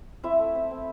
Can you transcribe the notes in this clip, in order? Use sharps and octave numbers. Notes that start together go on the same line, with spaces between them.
C4 E4 E5
A3
C4
C4